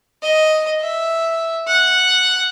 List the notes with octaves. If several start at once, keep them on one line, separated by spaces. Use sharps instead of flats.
D#5
E5
F#5